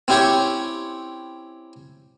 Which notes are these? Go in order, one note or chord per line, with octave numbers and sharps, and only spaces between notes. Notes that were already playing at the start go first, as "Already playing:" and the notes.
C4 C#4 E4 G4 C5 C#5